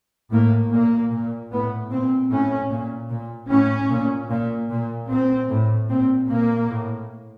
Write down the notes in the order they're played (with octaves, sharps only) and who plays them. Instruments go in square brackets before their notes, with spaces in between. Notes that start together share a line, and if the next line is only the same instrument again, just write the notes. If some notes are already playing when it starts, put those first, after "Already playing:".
[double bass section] A2 A#3
A#2 A#3
A#2
A2 B3
A#2 C4
A2 C#4
A#2
A#2
A2 C#4
A#2
A#2
A#2
A#2 C4
A2
A#2 C4
A#2 A#3
A2